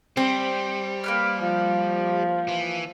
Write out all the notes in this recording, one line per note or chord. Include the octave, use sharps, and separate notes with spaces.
G3 C4 C5
A#3 B4 F6
F3
E3